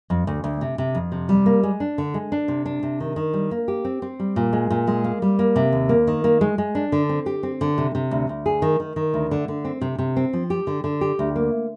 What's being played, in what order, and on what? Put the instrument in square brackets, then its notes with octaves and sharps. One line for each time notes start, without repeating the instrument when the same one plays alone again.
[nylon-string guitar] F2
D2
D2
C3
C3
F2
C3
G3
A#3
G#3
D4
D3
G#3
D4
C3
D4
C3
D#3
D#3
G3
A#3
G4
C4
C4
G3
A#2
G#3
A#2
G#3
A#3
G3
A#3
C3
D#2
A#3
D#3
A#3
G#3
G#3
D4
D3
C4
G4
C4
D3
C3
C3
D2
D2
G#4
D#3
D#3
D#3
D2
D3
D3
C4
C3
C3
C4
F3
G4
D3
D3
G4
D2
A#3